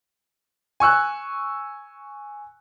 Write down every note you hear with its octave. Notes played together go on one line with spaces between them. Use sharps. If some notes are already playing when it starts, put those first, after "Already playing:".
G#5 C#6 E6 F#6